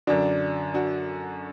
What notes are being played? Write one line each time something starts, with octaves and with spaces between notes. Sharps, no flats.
F#2 D3 D4 F#4
D4 F#4